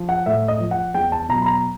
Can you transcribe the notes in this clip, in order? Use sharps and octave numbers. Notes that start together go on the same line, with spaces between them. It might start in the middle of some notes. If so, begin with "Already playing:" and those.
Already playing: F3
F#5
A2 E5
D#5
F3
F#5
E2 G5
A5
B2 F#3 A#5
B5
A#5